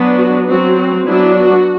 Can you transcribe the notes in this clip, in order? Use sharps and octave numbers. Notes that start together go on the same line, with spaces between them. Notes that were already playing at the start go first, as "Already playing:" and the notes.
Already playing: F#3 B3 D4
F#4
F#3 C4 F#4
F#4
F#3 B3 D4 E4
F#4